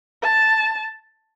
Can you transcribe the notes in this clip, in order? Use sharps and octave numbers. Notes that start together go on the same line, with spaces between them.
A5